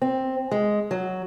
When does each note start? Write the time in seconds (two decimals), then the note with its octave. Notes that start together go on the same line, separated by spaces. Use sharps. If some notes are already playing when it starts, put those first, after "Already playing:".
0.02 C4
0.51 G#3
0.91 F#3